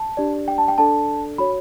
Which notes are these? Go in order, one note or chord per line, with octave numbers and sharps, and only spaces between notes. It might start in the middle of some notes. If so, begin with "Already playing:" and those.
Already playing: A5
D4 G4 D5
G5
A5
G5
D4 A4 D5 A5
F#4 C#5 B5